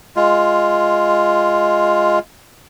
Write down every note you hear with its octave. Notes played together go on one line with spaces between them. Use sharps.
G#3 F4